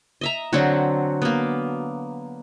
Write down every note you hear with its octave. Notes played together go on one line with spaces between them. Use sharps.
D#5 E5 A#5
D3 F#3 C4 F#4
A#3 B3